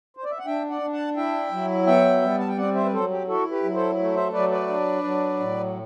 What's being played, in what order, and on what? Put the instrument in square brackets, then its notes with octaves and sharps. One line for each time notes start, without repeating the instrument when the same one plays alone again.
[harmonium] C5
D5
E5
F#5
D4 E5 G5
D5 F#5
D4
F#5 A5
E4 E5 G5
F#3
B3 E5 G5
G3
A5
G5
C4 D5 F#5
C5 E5
B4
F#3 A4 C5
G4
E4 F#4 A4
G4 B4
F#3
A4 C5
A3
C5 E5
F#3 B4 D5
B4 D5
D4
F#3
A2